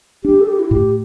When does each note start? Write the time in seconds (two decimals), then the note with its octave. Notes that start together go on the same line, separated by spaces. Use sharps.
0.24 D4 G4
0.41 A4
0.48 G4
0.59 E4
0.71 A2 G4